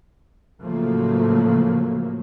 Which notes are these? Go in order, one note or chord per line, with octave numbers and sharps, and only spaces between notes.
A2 C#3 F3 F#3 A3 A#3